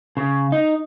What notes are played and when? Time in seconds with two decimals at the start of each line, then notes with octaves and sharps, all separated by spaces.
0.17 C#3
0.52 D#4